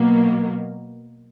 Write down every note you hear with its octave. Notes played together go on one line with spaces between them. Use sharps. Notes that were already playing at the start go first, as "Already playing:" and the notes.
Already playing: B2 F#3 A#3